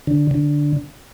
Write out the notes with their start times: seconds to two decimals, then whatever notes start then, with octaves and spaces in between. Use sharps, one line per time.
0.07 D3
0.31 D3